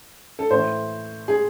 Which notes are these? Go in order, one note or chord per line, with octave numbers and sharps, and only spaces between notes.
A4
A2 E3 C5
G#4